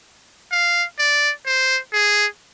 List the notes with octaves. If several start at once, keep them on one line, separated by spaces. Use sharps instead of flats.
F5
D5
C5
G#4